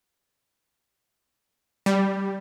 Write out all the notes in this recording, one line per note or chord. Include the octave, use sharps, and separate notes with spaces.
G3